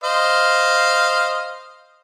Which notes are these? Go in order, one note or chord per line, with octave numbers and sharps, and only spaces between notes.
C5 D#5 F5